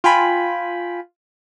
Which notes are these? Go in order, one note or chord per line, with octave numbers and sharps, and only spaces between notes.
F4 G5 G#5 B5